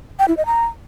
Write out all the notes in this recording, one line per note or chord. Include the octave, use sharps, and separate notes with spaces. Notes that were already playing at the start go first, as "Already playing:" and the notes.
G5
E4
D#5
A#5